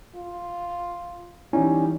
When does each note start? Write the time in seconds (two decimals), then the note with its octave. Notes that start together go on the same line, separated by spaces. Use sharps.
0.15 F4
1.53 E3 G3 C#4 D#4